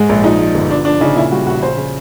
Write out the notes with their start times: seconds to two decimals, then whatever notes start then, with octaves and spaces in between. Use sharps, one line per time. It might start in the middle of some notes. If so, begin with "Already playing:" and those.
Already playing: G#2 G#3
0.09 A#1
0.24 F3 D#4
0.40 F3
0.55 G1
0.70 F3 D4
0.85 F3 D4
1.01 C#3 D#4
1.16 A#2 E4
1.31 G3 F#4
1.46 A#1 F#4
1.62 C#3 C5
1.77 C#3